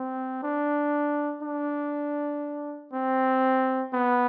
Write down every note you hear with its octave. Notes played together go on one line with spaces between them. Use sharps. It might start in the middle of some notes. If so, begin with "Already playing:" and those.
Already playing: C4
D4
D4
C4
B3